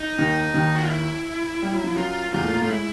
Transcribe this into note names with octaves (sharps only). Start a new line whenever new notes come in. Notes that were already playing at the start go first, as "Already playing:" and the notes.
Already playing: D#4
D#2 D#3
D#2 D#3
F#4
F4
E4
G3
F#3
F3
F#2 F#3 F4
E2 E3 F4
A2 A3
A#2 A#3
A2 A3 F4
G#3 E4